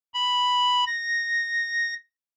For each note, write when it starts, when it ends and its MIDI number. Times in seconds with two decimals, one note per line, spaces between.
0.14 0.85 83
0.86 1.94 94